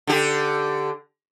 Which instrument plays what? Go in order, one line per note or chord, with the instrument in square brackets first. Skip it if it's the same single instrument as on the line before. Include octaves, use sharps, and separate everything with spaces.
[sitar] D3 G4